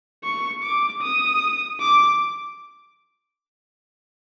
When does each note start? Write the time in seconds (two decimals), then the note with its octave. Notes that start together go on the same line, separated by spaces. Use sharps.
0.23 C#6
0.63 D6
1.02 D#6
1.80 D6